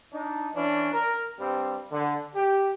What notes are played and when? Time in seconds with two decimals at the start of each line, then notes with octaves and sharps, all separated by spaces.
0.12 D4 D#4
0.54 E3 C#4 D4
0.92 A#4
1.38 G2 G3 C4
1.91 D3
2.35 G4